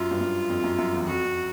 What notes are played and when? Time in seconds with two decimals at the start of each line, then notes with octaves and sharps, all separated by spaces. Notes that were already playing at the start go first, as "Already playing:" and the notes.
Already playing: F#2 F4
0.11 G2
0.21 F#2
0.50 F2
0.64 F#2
0.78 F#2
0.93 E2
1.07 F2 F#4
1.25 F2